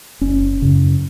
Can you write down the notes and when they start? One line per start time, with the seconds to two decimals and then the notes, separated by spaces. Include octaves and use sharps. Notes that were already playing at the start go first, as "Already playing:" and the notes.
0.21 F#1 C#4
0.62 F#2 C#3